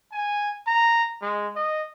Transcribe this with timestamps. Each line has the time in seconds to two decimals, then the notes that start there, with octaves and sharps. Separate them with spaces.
0.12 G#5
0.67 A#5
1.22 G#3
1.55 D#5